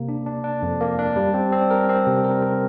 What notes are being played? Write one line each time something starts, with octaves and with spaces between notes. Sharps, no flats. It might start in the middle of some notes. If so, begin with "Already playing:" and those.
Already playing: C3 A#3
D4
D4
D4
F2
A#3
D4
G3
C4
C4
A#4
C4
C3
A#4
A#4